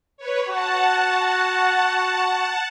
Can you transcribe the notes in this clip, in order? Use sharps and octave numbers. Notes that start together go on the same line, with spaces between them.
B4 C#5
F#4 F#5 A5